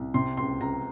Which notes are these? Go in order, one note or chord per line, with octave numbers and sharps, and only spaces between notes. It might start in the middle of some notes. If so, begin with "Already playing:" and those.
Already playing: C2
C3 C6
C#2 C6
C#2 A#5